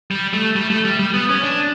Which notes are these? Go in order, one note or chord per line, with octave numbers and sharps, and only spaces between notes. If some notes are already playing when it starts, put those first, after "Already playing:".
G3
A3
G3
A3
G3
G3
B3
C#4
D4